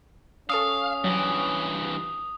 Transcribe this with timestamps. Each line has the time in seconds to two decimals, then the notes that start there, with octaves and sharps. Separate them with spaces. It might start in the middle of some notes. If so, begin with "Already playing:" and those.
0.49 C#4 A4 F5 C#6 D#6 E6
1.04 G2 E3 F#3